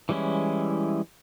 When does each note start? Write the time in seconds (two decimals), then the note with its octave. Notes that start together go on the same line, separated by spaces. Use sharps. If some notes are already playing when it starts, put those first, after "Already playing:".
0.09 E3 G3 G#3 C#4 E4